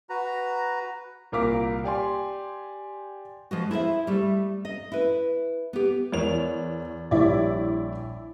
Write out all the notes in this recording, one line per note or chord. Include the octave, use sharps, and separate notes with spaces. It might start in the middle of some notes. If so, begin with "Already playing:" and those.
F#4 B4 A#5
C2 A#2 A#4 F5 D6 B6
G4 D5 G#5 C6
F3 G#3 F#4
E4 G#4 C5 E5
G3 A3
D#5
E4 B4
B3 G4
E2 A#4 C#5 F7
A#1 G3 E4 C#5 D5